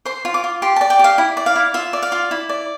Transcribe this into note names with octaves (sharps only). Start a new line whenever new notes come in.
C5 C6
F4
D6
F4
G4 C6
A5
D5
G5
G4 F5
E4
D5
F5
E4
F4 E5
D5
F5
F4
E4
D5